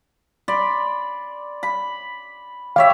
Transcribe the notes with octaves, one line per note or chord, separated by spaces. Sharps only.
D5 B5 C6
B5
G4 C#5 E5 F5